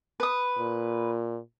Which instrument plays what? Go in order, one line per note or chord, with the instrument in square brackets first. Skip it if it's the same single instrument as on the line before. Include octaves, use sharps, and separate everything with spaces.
[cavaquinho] B4 D#6
[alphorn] A#2